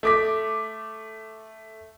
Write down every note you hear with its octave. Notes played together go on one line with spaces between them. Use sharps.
A3 D6 B6